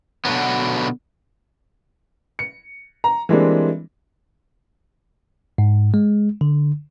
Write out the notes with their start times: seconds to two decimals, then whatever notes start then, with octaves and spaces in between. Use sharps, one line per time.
0.25 B2 D3 D#3 F#3 B3
2.39 C#7
3.04 A#5
3.29 E3 G3 G#3 A#3 C4 D4
5.58 G#2
5.94 G#3
6.41 D3